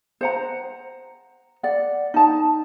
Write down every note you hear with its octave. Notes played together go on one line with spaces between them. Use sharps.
C5 F#5 A#5
D5 F#5
D#4 A5